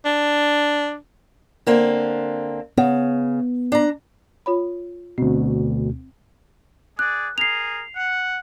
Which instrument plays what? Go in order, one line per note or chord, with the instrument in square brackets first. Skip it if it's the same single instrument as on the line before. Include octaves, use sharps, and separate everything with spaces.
[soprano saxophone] D4
[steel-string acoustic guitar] D3 A#3 C4
[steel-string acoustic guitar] C#3 [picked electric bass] B3
[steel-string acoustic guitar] D4 A#5
[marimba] F4 C#5 B5
[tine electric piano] D2 B2 [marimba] C4
[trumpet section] G#4 D5 [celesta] F#6
[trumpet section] G#4 A#4 [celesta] C7 F7
[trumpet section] F#5